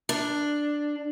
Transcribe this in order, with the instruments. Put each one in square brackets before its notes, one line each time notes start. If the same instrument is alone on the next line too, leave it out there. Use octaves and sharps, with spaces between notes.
[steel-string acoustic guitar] D4